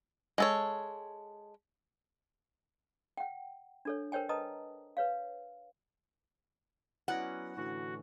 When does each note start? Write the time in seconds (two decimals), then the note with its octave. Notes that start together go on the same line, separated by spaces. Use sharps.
0.38 G#3 A4 C#5
3.17 F#5 G5
3.85 D4 A4 C#5
4.12 A#4 C5 C#5 G5 G#5
4.29 B4 D#5 A5 A#5 D#6
4.97 B4 C#5 F5
7.08 F#3 B3 C#4 E4 D5 F#5 A#6
7.57 A2 D3 E3 F#4